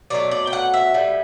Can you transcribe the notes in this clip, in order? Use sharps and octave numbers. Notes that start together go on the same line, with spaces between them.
B2 F#3 A3 D5
D5
G5
F#5
E5
A2 G3